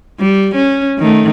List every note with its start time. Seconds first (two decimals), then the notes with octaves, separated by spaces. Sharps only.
0.19 G3
0.55 C#4
0.99 D#3 A3